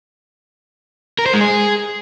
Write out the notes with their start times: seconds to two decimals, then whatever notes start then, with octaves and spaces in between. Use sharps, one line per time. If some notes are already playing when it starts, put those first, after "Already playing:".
1.19 A#4
1.26 C5
1.34 G#3
1.41 G#4